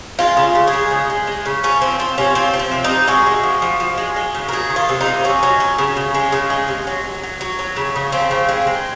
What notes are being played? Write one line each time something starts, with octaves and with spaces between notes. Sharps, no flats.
G#3 F4
C#3
C#3
G#4
G#3
C#3
G#3
G#3
C#3
F3 C#4
F3 C4
F3 C4
C3 C#4
F3 C4
F3
C4
C3
C3 D#4
G#3 F#4
G#3
F3
F3
F3
G#3
G#3
C#3
A#4
F#3 G#4
D#3
F4
C3
D#4
C3
F#3 C#4
F#3
F#3
C#3
C#3
G#3
C#3
G#3
C3
F#3
F#3
F#3
F#3
F#3
C#3
C#3
F3 C4
C#3
G#3
G#3